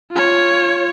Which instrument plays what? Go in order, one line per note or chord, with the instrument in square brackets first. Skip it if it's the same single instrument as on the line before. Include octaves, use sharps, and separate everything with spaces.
[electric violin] F4 C#5